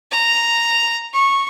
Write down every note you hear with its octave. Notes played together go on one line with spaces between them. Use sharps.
A#5
C#6